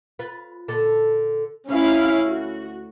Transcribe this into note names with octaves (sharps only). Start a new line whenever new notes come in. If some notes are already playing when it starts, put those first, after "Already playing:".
F4 B4
A#2 D3 A4
D2 C#4 E4 F5
F#4